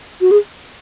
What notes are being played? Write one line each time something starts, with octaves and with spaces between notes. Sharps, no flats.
F#4
G#4